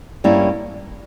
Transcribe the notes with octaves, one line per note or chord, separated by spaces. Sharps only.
G2 G3 A#3 C#4 E4